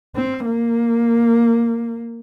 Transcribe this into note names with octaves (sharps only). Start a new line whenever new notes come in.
C4
A#3